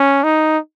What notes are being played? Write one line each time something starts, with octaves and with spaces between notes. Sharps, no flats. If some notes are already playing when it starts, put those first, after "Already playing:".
Already playing: C#4
D#4